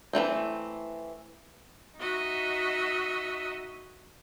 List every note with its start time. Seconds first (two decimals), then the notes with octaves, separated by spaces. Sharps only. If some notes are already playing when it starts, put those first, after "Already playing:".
0.13 E3 G3 A3 C4
1.97 D#4 F#4 D#5 E5